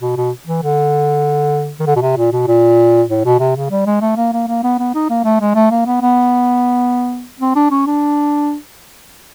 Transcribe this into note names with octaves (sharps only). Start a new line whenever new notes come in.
B2
B2
E3
D3
D#3
D3
B2
C3
A#2
B2
A#2
A2
B2
C3
C#3
G3
G#3
A3
A#3
A#3
A#3
B3
B3
D#4
A#3
A3
G#3
A3
A#3
B3
B3
C4
D4
C#4
D4